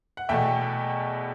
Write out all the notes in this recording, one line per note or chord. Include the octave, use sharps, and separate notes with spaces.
F#5
E2 B2 A3 E5 G5